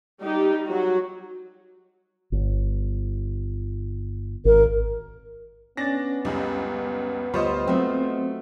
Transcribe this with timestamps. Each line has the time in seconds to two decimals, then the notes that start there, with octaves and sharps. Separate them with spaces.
0.20 G3 D#4 G4
0.67 F#3 F#4
2.32 G1
4.45 G#1 A#4
5.77 B3 C#4 D4 A6 A#6
6.25 C#2 F#2 G3
7.34 D2 G3 F4 C5 C#5 D#5 B5
7.67 F#3 A3 C4